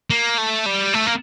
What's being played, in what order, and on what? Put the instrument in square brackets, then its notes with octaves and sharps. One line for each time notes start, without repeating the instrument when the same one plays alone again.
[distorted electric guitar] A#3
A3
G3
A3
A#3